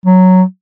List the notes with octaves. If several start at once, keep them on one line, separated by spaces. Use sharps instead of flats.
F#3